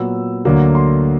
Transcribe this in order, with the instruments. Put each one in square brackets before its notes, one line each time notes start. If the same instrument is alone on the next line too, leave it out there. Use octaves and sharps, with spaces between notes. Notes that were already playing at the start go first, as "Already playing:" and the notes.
Already playing: [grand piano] A#2 F#3 B3 E6
D2 D3 F#3 A#3
C6